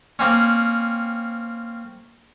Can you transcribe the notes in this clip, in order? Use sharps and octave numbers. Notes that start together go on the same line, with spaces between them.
A#3 C4 C#4